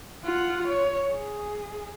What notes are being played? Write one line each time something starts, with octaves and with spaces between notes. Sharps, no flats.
F4 F#5
C#5
G#4